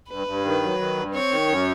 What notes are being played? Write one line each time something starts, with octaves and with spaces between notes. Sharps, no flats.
G2 B4
G2
D#3
F#3
D#3
G2
C4 C#5
D#3
F#2